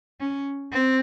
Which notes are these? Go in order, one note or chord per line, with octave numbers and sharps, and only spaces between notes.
C#4
C4